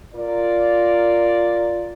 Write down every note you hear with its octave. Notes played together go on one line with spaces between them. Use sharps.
F4 A#4 D5